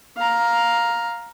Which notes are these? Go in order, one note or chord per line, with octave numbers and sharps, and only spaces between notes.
F5 A#5